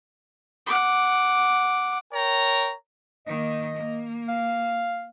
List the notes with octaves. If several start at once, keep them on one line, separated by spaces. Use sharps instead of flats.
F#5 D6
A#4 C#5 G5 A#5
D#3 A#3 D#5
A#3
F5